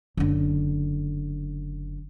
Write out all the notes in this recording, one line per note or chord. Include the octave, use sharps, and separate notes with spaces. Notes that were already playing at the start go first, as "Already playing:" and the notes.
F#1 D3